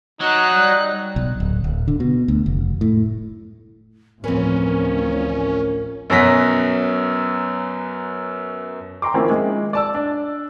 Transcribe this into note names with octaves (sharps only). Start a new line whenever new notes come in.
F#3 D#4 F#6
G3
B1
D1
D1
D3
B2
D2
F1
A2
A1 D2 F3 C4 C#4 A#4 B4
F#2 B2 F#3 A#6 B6
G5 A#5 C6 D6
D#3 F3 A#3 C4 C#4 E4
G#3
D5 A5 E6
D4